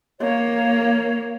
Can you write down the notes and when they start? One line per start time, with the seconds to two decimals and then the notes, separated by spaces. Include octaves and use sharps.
0.20 A#3 C#5